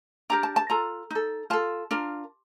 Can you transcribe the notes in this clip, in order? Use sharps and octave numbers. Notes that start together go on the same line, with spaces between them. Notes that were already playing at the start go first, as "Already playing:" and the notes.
D4 G4 A#4 A#5
A5
A5
F4 A4 A#5
D#4 A4
F4 A4 A5
D4 F4 A#4